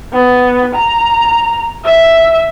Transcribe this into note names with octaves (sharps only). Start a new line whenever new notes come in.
B3
A#5
E5